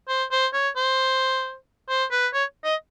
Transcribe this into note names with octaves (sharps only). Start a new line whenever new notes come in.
C5
C5
C#5
C5
C5
B4
C#5
D#5